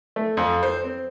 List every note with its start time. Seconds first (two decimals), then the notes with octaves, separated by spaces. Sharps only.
0.16 A3
0.37 F2
0.63 C5
0.84 C4